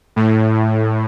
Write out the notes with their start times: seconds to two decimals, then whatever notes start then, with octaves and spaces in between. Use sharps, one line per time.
0.16 A2